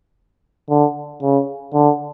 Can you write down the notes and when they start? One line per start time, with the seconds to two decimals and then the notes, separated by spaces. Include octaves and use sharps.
0.69 D3
1.22 C#3
1.74 D3